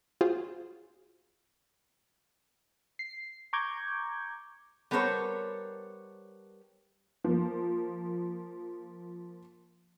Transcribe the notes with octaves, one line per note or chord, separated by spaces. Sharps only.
F4 F#4 G#4 C5
C7
A#5 C#6 D6 G6 G#6
G3 B3 A4 A#4 C5 C#5
F3 A#3